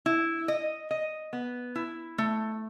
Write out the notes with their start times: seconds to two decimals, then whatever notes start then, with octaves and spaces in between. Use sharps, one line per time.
0.06 E4
0.48 D#5
0.91 D#5
1.33 B3
1.76 E4
2.18 A3